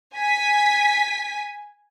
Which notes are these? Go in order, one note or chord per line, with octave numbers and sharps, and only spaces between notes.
G#5 B6